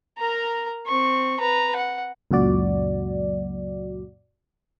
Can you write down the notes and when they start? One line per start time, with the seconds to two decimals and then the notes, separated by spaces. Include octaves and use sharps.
0.18 A#4 A#5
0.86 C4 C#6
1.40 B4 A#5
1.76 F#5
2.31 C#2 F#2 A#2 F#4 D5